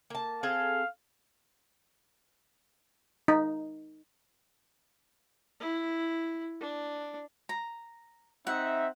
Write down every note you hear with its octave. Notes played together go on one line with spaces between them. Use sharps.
A#3 A5
C4 G#4 A4 F5
D#4
E4
D4
A#5
C4 D#4 E5 F#5